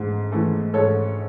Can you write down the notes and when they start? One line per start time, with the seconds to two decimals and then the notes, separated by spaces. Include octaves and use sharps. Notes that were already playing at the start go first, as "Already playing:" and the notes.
Already playing: G#2 E3 A3
0.32 E3 A3 E4
0.74 G#2 A4 C#5